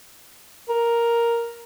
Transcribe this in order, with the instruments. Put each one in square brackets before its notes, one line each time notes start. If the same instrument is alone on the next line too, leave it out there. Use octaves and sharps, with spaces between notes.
[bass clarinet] A#4